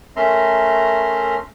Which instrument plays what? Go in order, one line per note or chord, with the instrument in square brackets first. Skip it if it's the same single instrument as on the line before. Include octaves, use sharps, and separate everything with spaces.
[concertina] A3 C#4 A#4 E5 A#5 C6